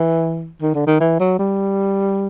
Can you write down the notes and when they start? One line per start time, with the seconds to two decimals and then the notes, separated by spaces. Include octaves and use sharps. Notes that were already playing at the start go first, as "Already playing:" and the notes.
Already playing: E3
0.62 D#3
0.75 D3
0.87 D#3
1.00 E3
1.20 F#3
1.39 G3